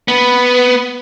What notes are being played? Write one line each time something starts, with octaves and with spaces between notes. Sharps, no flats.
B3